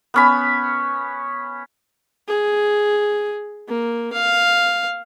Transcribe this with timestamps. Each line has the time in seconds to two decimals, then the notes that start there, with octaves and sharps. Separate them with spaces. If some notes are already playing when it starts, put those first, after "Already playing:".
0.14 B3 C#4 B5
2.28 G#4
3.68 A#3
4.13 F5